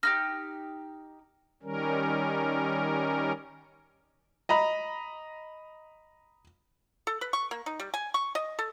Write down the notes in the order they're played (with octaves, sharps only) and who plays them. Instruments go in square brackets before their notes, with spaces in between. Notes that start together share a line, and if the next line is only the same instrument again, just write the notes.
[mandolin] D#4 E4 G4 [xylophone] F6 A#6
[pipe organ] D#3 G3 C#4 A#4
[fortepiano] D#5 A#5 B5
[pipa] A4
B4
C#6
A#3
D#4
G3
G#5
C#6
D#5
A4